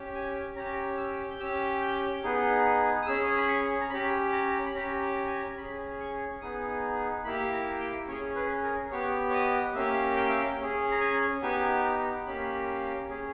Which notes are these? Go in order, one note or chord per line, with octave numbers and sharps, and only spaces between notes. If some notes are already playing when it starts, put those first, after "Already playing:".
Already playing: C#4 G4
G#5
C#4 G4 A#5
E6
G6
C#4 G4 E6
G6
B3 D#4 G#4
D#6
C#4 G#4 E6
B5
C#6
A#5
C#4 G4 B5
A#5
B5
C#4 G4 A#5
A#5
G#5
A#5
C#4 G#4 B5
C#6
B3 D#4 G#4 D#6
A#3 E4 G4 B5
A#5
G5
C#4 G#4 C#5
B4
A#4
B3 G4 C#5
C#5
D#5
A#3 C#4 G4 E5
G5
E5
G5
C#4 G#4
A#5
G#5
B3 D#4 G4 G#5
A#5
A#3 C#4 G4 B5
C#4 G#4